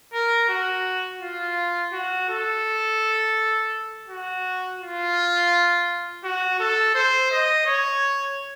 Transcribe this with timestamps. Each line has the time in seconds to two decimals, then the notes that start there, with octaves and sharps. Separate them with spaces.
0.13 A#4
0.49 F#4
1.21 F4
1.92 F#4
2.29 A4
4.08 F#4
4.80 F4
6.24 F#4
6.59 A4
6.95 C5
7.31 D#5
7.66 C#5